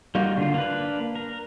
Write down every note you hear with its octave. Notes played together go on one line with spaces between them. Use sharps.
G3 A#3 D#4 F4 F#4
D3 F4
A#3 D4 B4
A#4